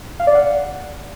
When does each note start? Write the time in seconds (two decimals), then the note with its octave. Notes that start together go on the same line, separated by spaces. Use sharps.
0.20 F5
0.27 D5
0.34 F#5